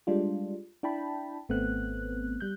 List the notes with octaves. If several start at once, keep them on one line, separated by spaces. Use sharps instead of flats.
G3 G#3 D4 F4
D4 E4 G5 A5 B5
G#1 A3 B3 C4 F#6
G3 F#6 G6